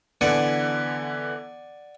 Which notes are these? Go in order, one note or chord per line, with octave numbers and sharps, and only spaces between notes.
D3 E3 B3 D5 F#5 G#5